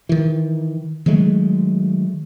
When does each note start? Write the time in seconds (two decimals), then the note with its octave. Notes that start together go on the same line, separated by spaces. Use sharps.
0.09 D#3 E3
1.06 D#3 F#3 G#3 A3